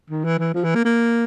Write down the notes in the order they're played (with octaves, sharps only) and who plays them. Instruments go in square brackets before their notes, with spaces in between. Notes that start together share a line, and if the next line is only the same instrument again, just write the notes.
[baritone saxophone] D#3
E3
E3
F3
E3
A#3
A#3